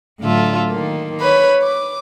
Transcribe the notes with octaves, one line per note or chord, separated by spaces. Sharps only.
A2 D3 F#3 F4 A4 E5
D#3 A#3
B4 C#5 B5
D6